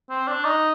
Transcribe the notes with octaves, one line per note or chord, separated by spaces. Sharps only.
C4
D4
D#4